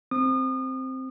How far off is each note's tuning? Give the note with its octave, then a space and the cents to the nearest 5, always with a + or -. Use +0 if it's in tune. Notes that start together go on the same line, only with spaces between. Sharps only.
C4 +0 D#6 -35